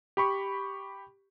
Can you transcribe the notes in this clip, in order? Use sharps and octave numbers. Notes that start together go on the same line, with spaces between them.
G4 B5 C#6